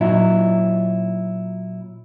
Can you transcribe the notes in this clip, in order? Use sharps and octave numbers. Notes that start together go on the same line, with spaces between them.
A#2 F#3 D#4 E4